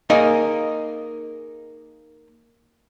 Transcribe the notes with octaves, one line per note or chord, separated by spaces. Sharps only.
A#3 D#4 G#4 D#5